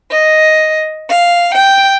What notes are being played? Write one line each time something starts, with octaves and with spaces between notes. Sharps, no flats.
D#5
F5
G5